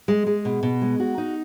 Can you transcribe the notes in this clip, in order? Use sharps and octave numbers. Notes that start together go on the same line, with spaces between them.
G#3
G#3
B2
B2
G#3
F#4
D#4